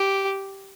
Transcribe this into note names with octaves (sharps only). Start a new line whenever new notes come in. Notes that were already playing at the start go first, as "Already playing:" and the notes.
Already playing: G4